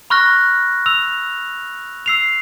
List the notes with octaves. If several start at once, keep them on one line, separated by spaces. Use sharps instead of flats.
B5 C#6 F6 F#6 A#6
E6 F7
E6 C7 F7